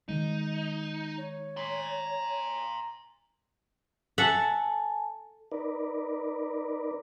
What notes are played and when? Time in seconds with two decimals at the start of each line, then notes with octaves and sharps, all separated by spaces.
0.09 D#3 G#3 D#4
1.18 C#5
1.57 A#5 C6
4.18 A4 E5 F#5 G#5 A5
5.52 D#4 A#4 B4 D5